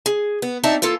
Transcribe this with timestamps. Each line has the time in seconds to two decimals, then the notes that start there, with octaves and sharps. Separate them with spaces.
0.06 G#4
0.42 B3
0.63 C4 D4 D#4 F#4 E5 A5
0.82 E3 A#3 F4 A4